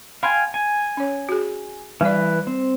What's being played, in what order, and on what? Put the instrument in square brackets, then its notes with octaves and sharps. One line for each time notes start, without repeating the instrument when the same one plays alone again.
[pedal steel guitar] F5 G5 G#5 [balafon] B5 C6
[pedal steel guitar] G#5
[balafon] C#4 C#5
F#4 G#4
[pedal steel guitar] E3 B4 [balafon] G3 D5
[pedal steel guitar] C4